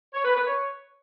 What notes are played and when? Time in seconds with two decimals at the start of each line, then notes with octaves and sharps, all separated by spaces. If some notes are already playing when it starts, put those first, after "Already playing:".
0.14 C#5
0.25 B4
0.36 B4
0.47 C#5